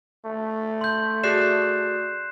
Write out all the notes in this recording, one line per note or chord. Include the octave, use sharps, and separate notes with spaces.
A3
C6 G6
F#4 G#4 D5 F#6 C7 E7